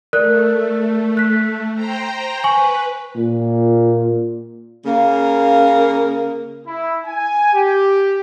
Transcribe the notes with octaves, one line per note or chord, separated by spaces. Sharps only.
A3 A#4 D5 F#6
F#6 B6
C5 G5 A#5
B4 G#5 C#6 F#7
A#2
C#3 A#3
E4
G#5
G4